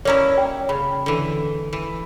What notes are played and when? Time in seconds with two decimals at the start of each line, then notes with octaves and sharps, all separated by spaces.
0.05 A#3 C#4 E4 C#5 D5 A#5
0.37 C#5 G5
0.69 C#3 B5
1.06 D3 E3
1.73 E3